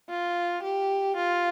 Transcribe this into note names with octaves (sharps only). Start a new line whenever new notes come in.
F4
G4
F4